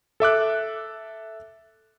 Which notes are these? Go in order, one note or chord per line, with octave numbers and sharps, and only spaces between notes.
A4 E5 D6 F#6